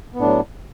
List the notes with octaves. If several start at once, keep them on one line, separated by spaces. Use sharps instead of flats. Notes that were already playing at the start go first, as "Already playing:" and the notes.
A2 F#3 B3 D4